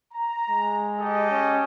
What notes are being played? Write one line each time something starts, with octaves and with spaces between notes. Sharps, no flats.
A#5
G#3
G4 A4 D#5
C#4